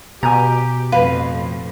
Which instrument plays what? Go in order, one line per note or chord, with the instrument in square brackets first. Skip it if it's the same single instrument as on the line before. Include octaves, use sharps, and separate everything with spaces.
[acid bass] B2 [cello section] G4 [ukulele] G#5 A#5
[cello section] F2 A2 [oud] B4 [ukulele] F5